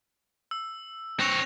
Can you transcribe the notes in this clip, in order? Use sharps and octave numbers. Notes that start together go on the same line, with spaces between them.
E6
C4 C#5 F#6 A#6 F7